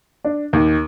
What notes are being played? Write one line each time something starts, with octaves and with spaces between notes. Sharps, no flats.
D4
D#2